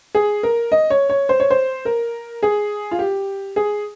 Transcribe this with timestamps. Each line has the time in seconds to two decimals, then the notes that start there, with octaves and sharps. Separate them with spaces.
0.15 G#4
0.43 A#4
0.72 D#5
0.90 C#5
1.10 C#5
1.29 C5
1.40 C#5
1.50 C5
1.85 A#4
2.43 G#4
2.91 F4
2.99 G4
3.56 G#4